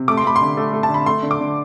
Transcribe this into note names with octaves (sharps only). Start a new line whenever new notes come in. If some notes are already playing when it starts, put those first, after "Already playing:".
Already playing: C3
A3 D6
C6
A3 B5
C6
D3
A3
A3
A5
D3
B5
A3 C6
D3
D6
D3